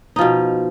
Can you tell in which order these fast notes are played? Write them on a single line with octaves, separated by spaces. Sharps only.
D#4 F3 B2